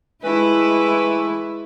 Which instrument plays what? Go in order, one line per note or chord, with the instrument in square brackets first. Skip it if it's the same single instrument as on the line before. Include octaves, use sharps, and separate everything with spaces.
[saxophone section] E3 A3 B4 [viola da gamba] G#3 E4